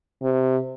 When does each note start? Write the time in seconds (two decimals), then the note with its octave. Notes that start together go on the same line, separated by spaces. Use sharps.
0.23 C3